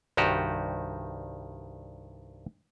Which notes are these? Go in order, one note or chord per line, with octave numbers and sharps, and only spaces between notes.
C2 G2 D#3 F#4 G4